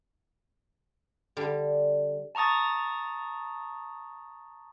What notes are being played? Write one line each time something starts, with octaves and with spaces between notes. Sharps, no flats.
D3 G3
A5 A#5 C#6 D#6 A6